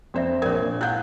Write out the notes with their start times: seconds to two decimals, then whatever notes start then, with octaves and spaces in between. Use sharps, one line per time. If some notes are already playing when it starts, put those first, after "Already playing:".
0.14 F2 F#4 C5 D5 E5
0.42 A#1 A#4 C#5 G#6
0.59 A#2
0.81 E4 F5 F#5 F#6 G6